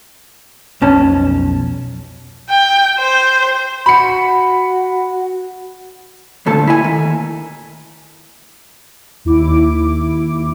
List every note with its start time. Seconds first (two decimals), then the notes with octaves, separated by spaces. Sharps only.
0.82 B1 F2 C#4 A5
2.50 G5
2.99 C5
3.86 F#4 B5 C#7
6.46 D2 A#2 A3 A5
6.67 E4 G#5
6.84 D#2
9.25 D#2 E4 D6